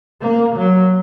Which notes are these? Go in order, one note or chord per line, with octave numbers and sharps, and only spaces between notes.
A#3
F#3